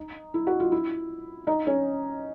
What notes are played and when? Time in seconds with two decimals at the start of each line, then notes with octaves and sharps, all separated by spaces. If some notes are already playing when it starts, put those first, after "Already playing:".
Already playing: D#4
0.34 E4
0.47 F#4
0.60 F4
0.72 E4
1.47 D#4
1.67 C#4